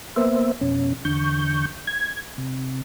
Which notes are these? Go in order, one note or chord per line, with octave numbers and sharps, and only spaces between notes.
A#3 B3 C5 E5
F2 B2 C#4
E2 D3 C#6 G6
G#6
C3